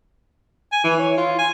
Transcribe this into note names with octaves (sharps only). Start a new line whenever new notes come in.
G#5
E3
C#5
F4
G#5